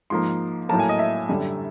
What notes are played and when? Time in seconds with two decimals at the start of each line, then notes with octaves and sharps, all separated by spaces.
0.10 G#2 F3 A#3 C6
0.69 A2 F#3 A#3 A5
0.79 G#5
0.89 D#5
0.99 E5
1.29 F#2 D3 G3